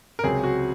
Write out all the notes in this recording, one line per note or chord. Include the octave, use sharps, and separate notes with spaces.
A#4
C#2 C3 F#3 C4 G#4
F#4